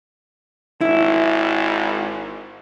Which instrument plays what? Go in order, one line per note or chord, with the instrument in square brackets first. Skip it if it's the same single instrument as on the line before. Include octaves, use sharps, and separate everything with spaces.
[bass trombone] G#1 [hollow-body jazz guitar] E4